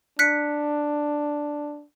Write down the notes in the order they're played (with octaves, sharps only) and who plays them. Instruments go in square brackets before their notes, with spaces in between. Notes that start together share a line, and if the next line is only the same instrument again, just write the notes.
[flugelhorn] D4 [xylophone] F#6 B6 C#7